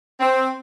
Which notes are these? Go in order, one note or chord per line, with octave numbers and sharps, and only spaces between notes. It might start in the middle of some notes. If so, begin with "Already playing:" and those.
C4